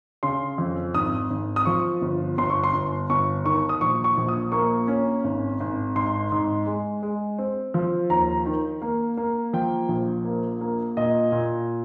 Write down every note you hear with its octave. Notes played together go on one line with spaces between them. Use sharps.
C#3 C6
F2
G#1 D#6
G#1
D#6
F3 C#6
G1
G1 C6
C#6
C6
G1
G1 C#6
D#3 C#6
D#6
A#1 C#6
C#6
A#1
D#6
A#3 C#6
C#4
G#1
G#1
G#2 C6
G#2
G#3
G#3
C4
F3
D#2 A#5
D#3
A#3
A#3
F3 G5
A#1
A#3
A#3
A#2 D#5
A#2